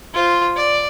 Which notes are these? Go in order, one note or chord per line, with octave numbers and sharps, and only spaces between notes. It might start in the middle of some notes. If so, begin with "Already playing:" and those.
F4 C5
D5